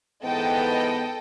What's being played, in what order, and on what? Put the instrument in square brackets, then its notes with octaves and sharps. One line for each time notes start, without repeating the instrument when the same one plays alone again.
[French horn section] G#2 E3 B3 [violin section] A4 D#5 G5